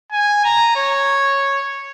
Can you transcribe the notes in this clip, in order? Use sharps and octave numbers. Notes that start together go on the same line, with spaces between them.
G#5
A#5
C#5